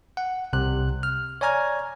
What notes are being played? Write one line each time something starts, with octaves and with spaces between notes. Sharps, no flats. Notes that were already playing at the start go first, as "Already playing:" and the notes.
F#5
C2 C3 F#6
F6
C#5 D5 G#5 A#5 F6 G#6